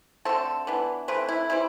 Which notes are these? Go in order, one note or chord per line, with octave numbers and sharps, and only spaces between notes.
D3 A3 C4 A4
E3 B3 D4
E3 A3 C4 B4
E4
E3 G3 C4 E4